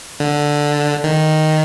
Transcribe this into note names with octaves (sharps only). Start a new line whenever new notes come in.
D3
D#3